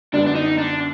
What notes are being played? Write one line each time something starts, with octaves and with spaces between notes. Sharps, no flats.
F#2 D3 G3 B3 D4
D4
D#4
D4